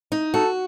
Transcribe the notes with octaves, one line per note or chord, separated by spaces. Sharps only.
D#4
F#4 A4